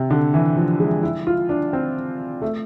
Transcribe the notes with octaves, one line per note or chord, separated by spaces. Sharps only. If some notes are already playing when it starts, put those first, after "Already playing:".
Already playing: C3
D3
E3
F3
G#3
E4
F4
D4
C4
A3